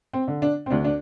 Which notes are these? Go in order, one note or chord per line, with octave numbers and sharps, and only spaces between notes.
C4
D3
D4
C4
D2 D4
D4